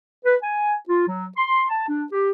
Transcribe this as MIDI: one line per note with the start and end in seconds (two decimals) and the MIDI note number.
0.25 0.35 71
0.42 0.74 80
0.88 1.03 65
1.07 1.26 54
1.36 1.64 84
1.69 1.85 81
1.88 2.04 62
2.12 2.31 67